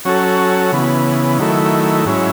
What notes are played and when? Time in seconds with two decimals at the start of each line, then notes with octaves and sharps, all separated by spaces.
0.05 F#3 C#4 F#4 A4
0.72 C#3 E3 B3
1.39 D#3 F#3 A3 E4
2.05 G#2 F#3 C#4 E4